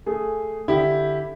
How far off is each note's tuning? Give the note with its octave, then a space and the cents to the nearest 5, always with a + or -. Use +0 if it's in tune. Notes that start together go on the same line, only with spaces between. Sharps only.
A3 +0 G#4 +0
D3 +5 E4 +0 G4 +0